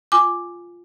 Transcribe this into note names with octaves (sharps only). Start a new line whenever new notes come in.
F4 G#5 D6